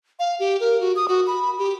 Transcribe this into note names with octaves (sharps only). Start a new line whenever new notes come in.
F5
G4
A#4
F#4
D#6
F#4
B5
G4